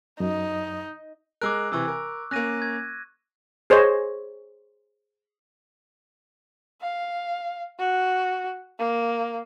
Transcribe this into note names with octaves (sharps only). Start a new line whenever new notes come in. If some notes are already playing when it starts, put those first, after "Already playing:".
F#2 D#4
G#3 A#4 D6 E6 F#6
C3 E3 C#6 E6 F#6
A#4
A#3 C#4 F#6 A#6 D#7
G#6
G#4 C5 C#5 D#5
F5
F#4
A#3